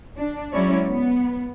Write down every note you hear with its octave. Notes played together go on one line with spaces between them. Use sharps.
D4
F#3 G#3 C#4 E4 C#5 D5
B3